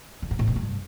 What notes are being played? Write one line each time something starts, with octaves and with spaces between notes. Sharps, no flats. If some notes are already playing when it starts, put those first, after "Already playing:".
D3
G#2
A2
B2
G2